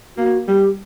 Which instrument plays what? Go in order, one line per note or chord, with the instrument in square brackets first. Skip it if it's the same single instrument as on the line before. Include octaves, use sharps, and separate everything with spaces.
[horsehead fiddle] A#3 [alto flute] F#4
[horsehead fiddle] G3 [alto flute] G4